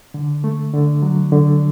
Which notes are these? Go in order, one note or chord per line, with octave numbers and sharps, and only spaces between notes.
D3
A3
D3
F#3
D3